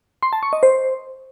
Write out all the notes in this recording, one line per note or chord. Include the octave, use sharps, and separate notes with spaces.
C6
A5
C#6
D#5
C5